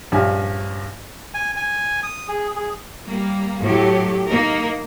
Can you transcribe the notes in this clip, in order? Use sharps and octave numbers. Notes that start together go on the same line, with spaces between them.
A#1 G2 C#4 G#5
G#5
G#5
D#6
G#4
G#4
G3 A#3
A2 F#3 G4
A#3 D#4 A#4